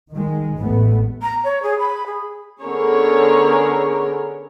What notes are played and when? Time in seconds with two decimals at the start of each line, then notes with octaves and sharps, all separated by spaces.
0.13 D#3 G#3
0.57 A1 E2 A3 B3
1.21 A#5
1.44 C#5
1.62 G#4
1.79 B5
2.06 G#4
2.62 D3 B3 C#4 G#4 A#4 C#5